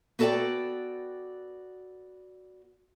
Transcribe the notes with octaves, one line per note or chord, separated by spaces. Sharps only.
B3 F#4 A4 B4 D5 G5